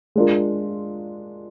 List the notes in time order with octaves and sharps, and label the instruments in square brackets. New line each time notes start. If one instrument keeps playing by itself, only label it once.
[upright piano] G#3 D4 F4 A#4